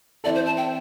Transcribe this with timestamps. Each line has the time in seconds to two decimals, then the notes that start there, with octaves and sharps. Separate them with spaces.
0.24 E3 C4 E4 A4 D5
0.35 C5
0.46 A5
0.57 G5